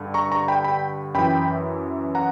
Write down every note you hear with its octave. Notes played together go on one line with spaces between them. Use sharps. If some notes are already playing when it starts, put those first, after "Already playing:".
Already playing: G2 D3
A#5 C#6
A#5 C#6
G5 B5
G5 B5
F#2 E3 G5 B5
F#5 A#5